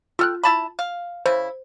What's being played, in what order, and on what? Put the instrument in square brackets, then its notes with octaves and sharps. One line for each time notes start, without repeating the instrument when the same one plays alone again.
[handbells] F4 F6 F#6 [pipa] A4 G5
[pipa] E4 A5 B5
F5
[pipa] C#3 E4 [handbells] C5